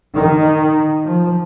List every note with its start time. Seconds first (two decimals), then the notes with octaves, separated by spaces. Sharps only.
0.14 D#3
1.05 F3